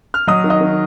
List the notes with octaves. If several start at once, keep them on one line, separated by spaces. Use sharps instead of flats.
F6
F#3 D#5 D#6
D#3
D#5 D#6
D#3